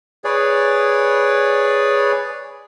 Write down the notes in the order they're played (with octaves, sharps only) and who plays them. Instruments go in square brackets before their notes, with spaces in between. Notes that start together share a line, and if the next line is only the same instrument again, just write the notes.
[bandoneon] G#4 B4 C#5 D5